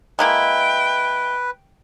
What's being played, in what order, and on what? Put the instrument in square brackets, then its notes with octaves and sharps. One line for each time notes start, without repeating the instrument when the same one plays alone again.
[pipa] G#3 A#3 E4 [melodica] B4 [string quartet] G5